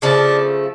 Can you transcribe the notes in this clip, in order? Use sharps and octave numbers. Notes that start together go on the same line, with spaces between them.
C#3 F3 A3 D4